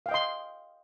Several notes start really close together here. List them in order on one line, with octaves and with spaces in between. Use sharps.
F5 G5 D#5 C6